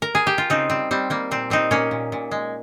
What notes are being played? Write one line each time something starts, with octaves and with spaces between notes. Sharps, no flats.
A#4
G#4
G4
F4
C#3 C4 D#4
G3 C4
G3 C4
G3 A#3
A#2 C4
G3 C4 D#4
A#2 A#3 C#4
A#2
A#2
G#3